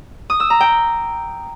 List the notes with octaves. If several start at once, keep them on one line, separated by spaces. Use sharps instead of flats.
D#6
E6
A#5
G5